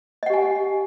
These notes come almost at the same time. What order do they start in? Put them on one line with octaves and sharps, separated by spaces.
D#5 F#5 G4 G#5